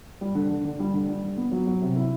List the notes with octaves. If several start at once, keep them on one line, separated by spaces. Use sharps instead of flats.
G3
D3
D3
D3
G3
D3
G3
D3
B3
F#3
F#3
C3
E4